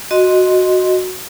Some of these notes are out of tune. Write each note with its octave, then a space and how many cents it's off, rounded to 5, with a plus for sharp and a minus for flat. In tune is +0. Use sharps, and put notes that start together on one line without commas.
F#4 -5 D#5 +0 C6 +0